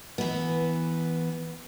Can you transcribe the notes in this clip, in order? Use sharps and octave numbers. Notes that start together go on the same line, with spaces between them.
E3 B3